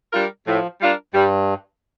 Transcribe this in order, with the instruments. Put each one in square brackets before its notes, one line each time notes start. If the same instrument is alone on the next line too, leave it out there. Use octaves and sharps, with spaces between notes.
[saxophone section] G3 D4 F4 A#4
[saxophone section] A2 [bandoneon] F3
[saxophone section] G3 D4 F4 A#4
[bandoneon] G2 [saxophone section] G3